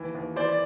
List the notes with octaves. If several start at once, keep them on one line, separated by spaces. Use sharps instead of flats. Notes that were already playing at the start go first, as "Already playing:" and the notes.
Already playing: D#2 E3
D#2
E3 C5 D5
D5